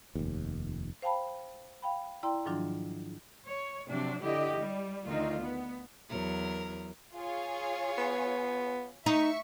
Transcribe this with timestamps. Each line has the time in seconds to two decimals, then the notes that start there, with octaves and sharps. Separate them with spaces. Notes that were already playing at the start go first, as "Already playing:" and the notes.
0.15 F1 D#2
1.02 C5 F5 G5 A5 B5
1.82 F5 G5 B5
2.23 E4 D5 G5 A#5 C6
2.45 G#2 D#3 F3 F#3 D4 F4
3.45 C#5
3.88 C3 F3 F#3 D4
4.21 D3 E4 G4 D#5
4.57 G3
5.06 D2 D#3 D#4 F4
5.40 B3
6.10 E2 F#3 A#4
7.13 F4 G#4 C#5
7.98 B3
9.06 D#4 E5 C#6